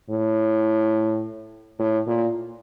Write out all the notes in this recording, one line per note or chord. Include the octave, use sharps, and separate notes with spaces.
A2
A2
A#2